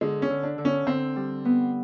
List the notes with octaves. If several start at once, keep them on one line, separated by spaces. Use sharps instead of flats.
D3 G#3
C#4
D3
D4
D3
C#4
D3 C4
G3
B3